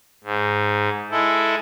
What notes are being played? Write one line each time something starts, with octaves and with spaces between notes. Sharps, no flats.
G#2
G#3 E4 A4